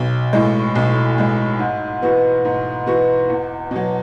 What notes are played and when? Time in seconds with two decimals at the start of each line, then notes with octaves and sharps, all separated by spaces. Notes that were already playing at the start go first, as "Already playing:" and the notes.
Already playing: B1
0.33 A2 G#3
0.75 B1
1.18 A2 G#3
1.59 G#2
2.02 E3 B3 F#4
2.45 G#2
2.86 E3 B3 F#4
3.30 E2
3.71 B2 F#3